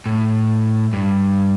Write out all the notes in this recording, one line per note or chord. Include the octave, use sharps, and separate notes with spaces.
A2
G2